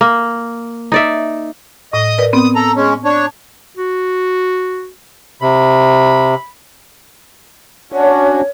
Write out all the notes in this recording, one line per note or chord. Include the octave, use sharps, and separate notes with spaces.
A#3
D#4 D5 E5
A2 D#5 D#6
A#4 B4 D5
B3 C4 D#6
A4 A#5
G#3 C#4
D4 C#5
F#4
C3 B5
C#4 D4 F#4 C#5